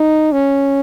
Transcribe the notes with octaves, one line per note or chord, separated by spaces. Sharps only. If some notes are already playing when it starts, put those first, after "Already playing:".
Already playing: D#4
C#4